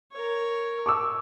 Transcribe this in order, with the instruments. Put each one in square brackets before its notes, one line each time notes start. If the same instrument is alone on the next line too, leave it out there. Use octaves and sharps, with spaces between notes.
[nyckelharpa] A#4 C#5
[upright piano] C#6 D6 E6